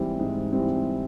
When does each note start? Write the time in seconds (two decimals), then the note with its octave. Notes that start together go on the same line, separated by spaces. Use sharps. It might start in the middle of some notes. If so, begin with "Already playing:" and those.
Already playing: G#2 E3 G3 C4
0.19 G#2
0.52 E3 G3 C4